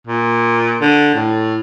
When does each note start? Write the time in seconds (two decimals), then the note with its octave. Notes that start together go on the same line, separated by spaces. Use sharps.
0.07 A#2
0.81 D3
1.15 A2